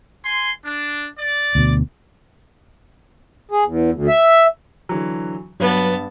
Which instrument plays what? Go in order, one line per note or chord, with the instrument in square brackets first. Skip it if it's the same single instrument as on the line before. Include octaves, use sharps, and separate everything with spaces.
[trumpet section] G#5 C6
D4
D5
[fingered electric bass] D2 B2
[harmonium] G#4
E2
D2
E5
[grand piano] D3 E3 F#3
[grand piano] G2 [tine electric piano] F#3 B4 [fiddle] B3 A5